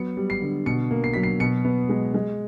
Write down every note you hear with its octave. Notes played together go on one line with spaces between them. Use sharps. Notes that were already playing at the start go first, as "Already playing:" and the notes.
Already playing: F#3 B3 C#7
G3
C7
D3
B2 C#7
A#3
C7
F#3 B6
C7
B2 C#7
B3
G#3
G#3